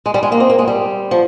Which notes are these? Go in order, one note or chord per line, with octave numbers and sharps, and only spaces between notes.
G#3
G3
G#3
A#3
C4
A#3
G#3
G3
F3